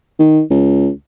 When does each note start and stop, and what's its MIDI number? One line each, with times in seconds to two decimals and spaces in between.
0.19 0.41 51
0.51 0.89 37